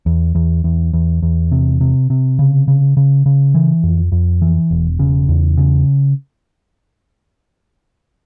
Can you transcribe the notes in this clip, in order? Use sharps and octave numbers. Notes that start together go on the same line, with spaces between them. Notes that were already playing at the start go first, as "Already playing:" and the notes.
E2
E2
E2
E2
E2
C3
C3
C3
C#3
C#3
C#3
C#3
E3
F2
F2
E3
E1
C#3
E2
C#3